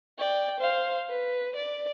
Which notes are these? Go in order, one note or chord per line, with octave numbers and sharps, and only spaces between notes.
D5 G5
C5 F5
B4
D5